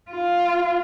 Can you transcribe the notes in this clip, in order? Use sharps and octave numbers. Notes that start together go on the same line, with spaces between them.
F4